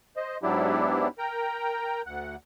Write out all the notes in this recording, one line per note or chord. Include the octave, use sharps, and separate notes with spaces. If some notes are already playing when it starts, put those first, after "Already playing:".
C5 D#5
G#2 F#3 B3 D4 E4 G4
A#4 G5 A#5
D2 F#5